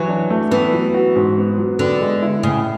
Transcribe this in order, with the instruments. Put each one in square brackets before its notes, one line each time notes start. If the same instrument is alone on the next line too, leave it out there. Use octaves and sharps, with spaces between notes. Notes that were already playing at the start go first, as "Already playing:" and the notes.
Already playing: [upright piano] E3 [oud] F#3
[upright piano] D4
A3
[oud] E3 [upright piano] B3
[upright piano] F#3
F#4
G#2
B3
F#3
[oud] D3 [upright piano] B3
[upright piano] G#3
E4
[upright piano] A2 [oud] C#3